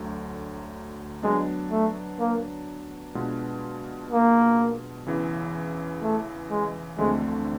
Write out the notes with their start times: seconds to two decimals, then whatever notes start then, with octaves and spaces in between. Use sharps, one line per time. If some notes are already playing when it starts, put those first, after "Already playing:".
Already playing: D2 D3 F#3 A3
1.23 F#3 G#3 B3 D4
1.71 A3
2.19 A#3
3.15 B2 G#3 B3 D4 F4
4.11 A#3
5.06 E2 C#3 E3
6.02 A3
6.51 G#3
6.98 D2 D3 F3 G#3 A3 C4